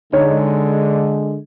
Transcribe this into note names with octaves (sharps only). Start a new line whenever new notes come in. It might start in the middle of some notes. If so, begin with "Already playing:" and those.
D3 G#3 D#4 C#5